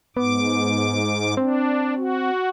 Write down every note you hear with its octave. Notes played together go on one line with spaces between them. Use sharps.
G#2 B3 D6
C4 D4
F#4